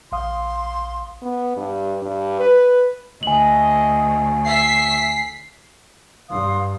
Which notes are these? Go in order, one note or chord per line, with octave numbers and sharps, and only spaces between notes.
A#1 F5 C6 D#6
B3
G2
G2
B4
D2 D#5 G#5 F#7
E5 B6 C7
G2 F5 C6 D#6